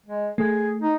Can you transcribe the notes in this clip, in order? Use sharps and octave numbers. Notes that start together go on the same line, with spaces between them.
G#3
A3 G#4
D#4